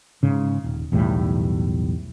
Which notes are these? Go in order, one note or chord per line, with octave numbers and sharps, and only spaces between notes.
G#2 C#3
D#1
B1 E2 A2 G3